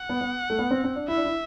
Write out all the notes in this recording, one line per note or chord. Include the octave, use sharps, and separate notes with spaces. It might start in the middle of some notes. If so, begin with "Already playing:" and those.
Already playing: F#5
B3
B3
A3
B3
C4
C4
D4
E4 E5
D4
E4